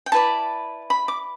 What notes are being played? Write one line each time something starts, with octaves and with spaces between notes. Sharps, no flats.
G5
E4 B4 D5 A5
B5
D6